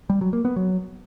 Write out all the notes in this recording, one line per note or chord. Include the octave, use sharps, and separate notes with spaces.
G3
F#3
A#3
B3
F#3